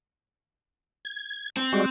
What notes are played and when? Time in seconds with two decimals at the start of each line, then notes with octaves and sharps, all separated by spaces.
1.05 G#6
1.57 C4
1.72 G3 G#3 F#4